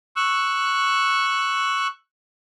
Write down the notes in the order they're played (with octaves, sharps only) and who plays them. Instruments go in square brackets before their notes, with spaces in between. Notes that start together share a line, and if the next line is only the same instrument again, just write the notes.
[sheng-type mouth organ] C#6 E6 F#6